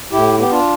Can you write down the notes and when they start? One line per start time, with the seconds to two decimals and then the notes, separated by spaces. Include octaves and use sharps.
0.12 A2 E4 G4
0.38 B3 G4
0.51 D4 F4